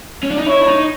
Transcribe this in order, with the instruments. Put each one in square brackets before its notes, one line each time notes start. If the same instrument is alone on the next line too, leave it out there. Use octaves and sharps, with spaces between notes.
[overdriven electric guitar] C#4
D4
D#4
[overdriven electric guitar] E4 [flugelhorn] C#5
[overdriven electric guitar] D4
D#4